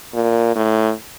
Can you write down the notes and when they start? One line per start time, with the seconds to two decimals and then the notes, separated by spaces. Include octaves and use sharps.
0.14 A#2
0.55 A2